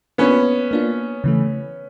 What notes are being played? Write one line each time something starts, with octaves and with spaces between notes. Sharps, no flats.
A#3 B3 C#4 D4 F4
A#3 D4 F4
C#3 E3 A3